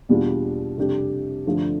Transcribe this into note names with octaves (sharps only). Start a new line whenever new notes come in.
E2 B2 G3 D4 F4
F2 C3 G3 D4 G4
G2 D3 F3 A3